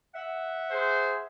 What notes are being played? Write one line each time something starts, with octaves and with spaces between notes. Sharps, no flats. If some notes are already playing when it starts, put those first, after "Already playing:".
E5 F#5
G#4 C5